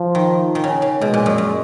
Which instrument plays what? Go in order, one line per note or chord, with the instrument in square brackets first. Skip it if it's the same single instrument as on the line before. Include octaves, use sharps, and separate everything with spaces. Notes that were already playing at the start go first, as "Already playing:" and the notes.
Already playing: [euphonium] F3
[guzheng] D#3
D#3
C#3
C#3
[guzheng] B2 [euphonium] G#3
[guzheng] A#2
F#2
F#2